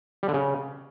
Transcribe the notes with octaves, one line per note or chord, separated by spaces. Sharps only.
G3
D3
C#3